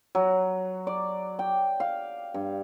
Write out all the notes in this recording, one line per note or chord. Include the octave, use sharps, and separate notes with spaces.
F#3
D5
G5
F5
G2